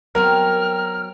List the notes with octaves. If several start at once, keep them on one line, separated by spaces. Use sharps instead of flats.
F#3 B3 C4 A#4 F6